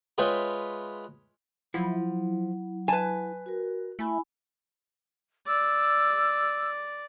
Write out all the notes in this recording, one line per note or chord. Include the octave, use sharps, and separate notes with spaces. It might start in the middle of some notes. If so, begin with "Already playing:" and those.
G#3 F4 B4 C#5 E5 G5
F3 F#3 E4
B4 G#5 A5
F#4 A#4
A3 E4 G#5 B5
D5 E6